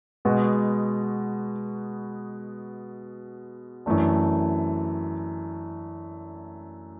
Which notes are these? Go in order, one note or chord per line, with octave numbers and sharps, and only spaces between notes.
B2 G#3 B3 F#4
F#2 E3 A3 D4